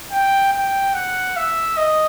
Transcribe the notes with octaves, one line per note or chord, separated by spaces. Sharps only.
G5
G5
F#5
E5
D#5